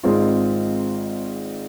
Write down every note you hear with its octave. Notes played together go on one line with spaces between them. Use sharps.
G#1 G#2 G#3 C4 F4